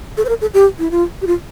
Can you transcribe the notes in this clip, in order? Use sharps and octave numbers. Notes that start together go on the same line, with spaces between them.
A4
C5
A#4
A4
G4
E4
F4
G4
F4